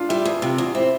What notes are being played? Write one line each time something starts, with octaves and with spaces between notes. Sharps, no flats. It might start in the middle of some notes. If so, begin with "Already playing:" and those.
Already playing: D4 F4
G3 E4
E2
C3 F4
E2
C4 E4